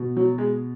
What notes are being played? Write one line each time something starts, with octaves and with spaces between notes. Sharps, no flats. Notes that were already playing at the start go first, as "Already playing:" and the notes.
Already playing: B2
F#3
G#3